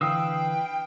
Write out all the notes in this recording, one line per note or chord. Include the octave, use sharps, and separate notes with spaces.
D3 E3 B4 F5 G5 D#6 E6